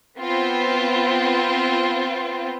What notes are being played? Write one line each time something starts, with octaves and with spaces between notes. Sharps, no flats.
B3 C4 F4